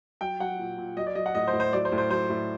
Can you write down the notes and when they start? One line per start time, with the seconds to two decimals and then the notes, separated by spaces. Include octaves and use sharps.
0.21 F#3 G5
0.40 F#3 F#5
0.59 A#2
0.78 A#2
0.97 F#3 D#5
1.07 D5
1.15 F#3 D#5
1.26 F#5
1.35 A2 D#5
1.48 C5
1.53 A2
1.60 C5
1.73 F#3 D5
1.85 C5
1.92 A2
1.98 C5
2.10 F#3 C5
2.30 A2